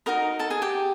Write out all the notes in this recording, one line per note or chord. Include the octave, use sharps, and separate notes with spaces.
D#4 F#4 A#4 D#5 A#5
A4 A5
G#4 G#5
G4 G5